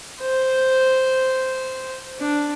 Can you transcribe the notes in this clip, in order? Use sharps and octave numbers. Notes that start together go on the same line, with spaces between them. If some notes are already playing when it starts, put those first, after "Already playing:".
C5
D4